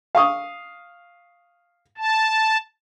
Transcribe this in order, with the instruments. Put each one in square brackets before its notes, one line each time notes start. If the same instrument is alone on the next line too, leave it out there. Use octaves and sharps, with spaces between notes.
[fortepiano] F5 C#6 D#6
[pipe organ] A5